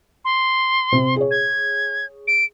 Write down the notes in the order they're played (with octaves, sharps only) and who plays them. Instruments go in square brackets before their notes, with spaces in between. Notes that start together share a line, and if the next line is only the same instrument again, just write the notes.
[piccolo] C6
[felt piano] C3 C4
G#4 C#5
[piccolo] G#6
D7